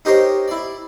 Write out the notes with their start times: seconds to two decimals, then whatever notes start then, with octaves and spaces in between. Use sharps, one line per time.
0.05 D#4 G4 A#4 C5 C#5 D#5
0.48 E4 D5